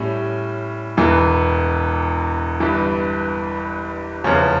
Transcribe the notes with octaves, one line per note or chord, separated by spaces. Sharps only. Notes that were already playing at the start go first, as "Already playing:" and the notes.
Already playing: A2 G3 C#4
E1 E2 E3
G1 G2 E3
F1 E2 C#3 F3 C#4